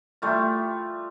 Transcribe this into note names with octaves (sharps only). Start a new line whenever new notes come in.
G3 A3 F4